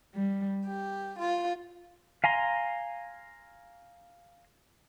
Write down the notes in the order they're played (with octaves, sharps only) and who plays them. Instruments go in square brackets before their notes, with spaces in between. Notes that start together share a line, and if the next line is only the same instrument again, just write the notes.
[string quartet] G3
G4
F4
[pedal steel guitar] F5 G#5 A#5 C6